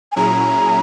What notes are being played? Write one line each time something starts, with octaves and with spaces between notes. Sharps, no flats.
G#5
A#2 F#3 C#4 E4 G#4 A#5